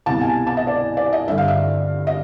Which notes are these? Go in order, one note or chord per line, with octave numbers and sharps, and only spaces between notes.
C2 B2 A5
G#5
A5
D#5
D5
D5
D#5
G2 D3 E5
F5
E5
D#5